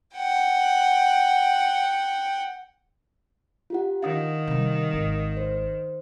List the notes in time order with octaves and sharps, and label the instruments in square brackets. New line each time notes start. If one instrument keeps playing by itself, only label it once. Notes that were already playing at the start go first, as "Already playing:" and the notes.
[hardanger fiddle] F#5 G5
[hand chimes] F4 G4 F#5
[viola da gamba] D#3 [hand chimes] F5 F#5 D#6
[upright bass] C3 G3
G#1
[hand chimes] C5